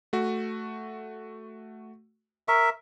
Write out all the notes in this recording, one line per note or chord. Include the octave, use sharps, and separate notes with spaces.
A3 F#4
A#4 E5 C#6